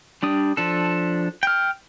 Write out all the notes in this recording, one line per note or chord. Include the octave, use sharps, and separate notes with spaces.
G3 D4 D#6
F3 D4 A4
G5 F6